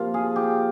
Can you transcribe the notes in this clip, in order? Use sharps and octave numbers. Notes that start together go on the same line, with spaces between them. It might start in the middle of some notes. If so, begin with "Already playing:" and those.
Already playing: C3 F3 A#3 F4
G#4
G4